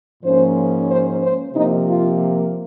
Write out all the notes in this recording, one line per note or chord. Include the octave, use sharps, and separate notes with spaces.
G#2 F3 A#3 C#4 C5
C5
C5
C3 F3 A#3 D#4
F4